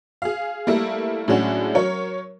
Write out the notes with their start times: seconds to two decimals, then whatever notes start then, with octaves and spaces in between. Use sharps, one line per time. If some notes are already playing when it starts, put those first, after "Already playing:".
0.22 G#4 F5
0.67 G3 A3 A#3 E4
1.28 A2 F#3 G#3 C#4 D4 F#4
1.75 F#3 A#4 C#5